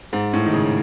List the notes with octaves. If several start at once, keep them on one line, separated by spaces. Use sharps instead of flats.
G#2
A2
D#3
C#3